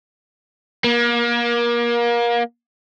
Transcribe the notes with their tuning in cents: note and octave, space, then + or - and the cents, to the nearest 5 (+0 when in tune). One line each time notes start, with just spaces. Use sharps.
A#3 +30